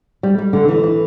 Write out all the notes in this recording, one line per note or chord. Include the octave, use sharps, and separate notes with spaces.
G3
G3
D3
E3
E3